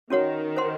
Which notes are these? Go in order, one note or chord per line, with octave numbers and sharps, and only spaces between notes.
D#3 C#4 F#4 C#5 F#5
C5 F#5 C6